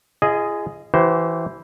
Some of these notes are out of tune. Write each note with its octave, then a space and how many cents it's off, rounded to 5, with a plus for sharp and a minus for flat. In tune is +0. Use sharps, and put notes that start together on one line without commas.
F4 -40 G#4 +0 D#5 +0
E3 +0 G4 -45 C5 +0